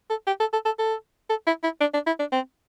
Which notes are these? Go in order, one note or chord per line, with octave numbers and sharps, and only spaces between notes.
A4
G4
A4
A4
A4
A4
A4
E4
E4
D4
D4
E4
D4
C4